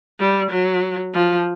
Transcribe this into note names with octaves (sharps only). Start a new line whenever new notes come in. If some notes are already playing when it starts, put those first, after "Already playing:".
G3
F#3
F3